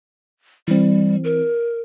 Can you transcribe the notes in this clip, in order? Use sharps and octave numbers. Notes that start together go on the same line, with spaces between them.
E3 G3 C4
A#4